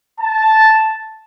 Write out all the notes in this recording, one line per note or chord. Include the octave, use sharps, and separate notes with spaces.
A5